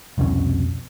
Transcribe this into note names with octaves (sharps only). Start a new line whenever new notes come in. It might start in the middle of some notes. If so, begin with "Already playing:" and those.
C2 F2 B2 C#4